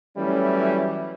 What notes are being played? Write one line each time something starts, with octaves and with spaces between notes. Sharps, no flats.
E3 F#3 G3 A3 C#4 E4